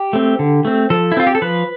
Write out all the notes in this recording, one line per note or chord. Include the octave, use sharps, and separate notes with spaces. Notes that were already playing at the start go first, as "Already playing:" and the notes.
Already playing: G4
A3 C4
D3
A3 C4
F3 A4
E4
C4 F4
G4
A4
F3 B4